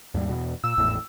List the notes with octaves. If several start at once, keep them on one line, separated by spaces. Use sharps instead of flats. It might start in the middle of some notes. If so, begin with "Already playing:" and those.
D#2 G#2 G3
E2 B2
A#2 E6
G#1 E2 A2